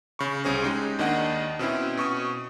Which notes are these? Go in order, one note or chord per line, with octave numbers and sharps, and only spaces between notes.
C#3 B5 C#6
C2 C#4 G#4 C5 A#6
G#3 D#4 G4
D#2 D#3 D4 D#5 F#5
B2 C4 C#4 E4
B2 C#6 D#6